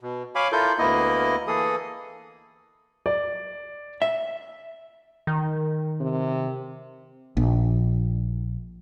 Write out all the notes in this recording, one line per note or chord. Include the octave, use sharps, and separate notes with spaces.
B2
C#5 F5 G#5 B5 D6
E4 F4 A4 A#4 G6
D2 A#3 B3 E4 D#5
E3 A#3 G#4 A4 D#6
D5
E5
D#3
C3
A#1